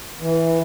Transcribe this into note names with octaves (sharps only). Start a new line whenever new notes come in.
E3